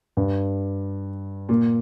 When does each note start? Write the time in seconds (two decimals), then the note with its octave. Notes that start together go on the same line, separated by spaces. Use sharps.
0.17 G2
1.49 A#2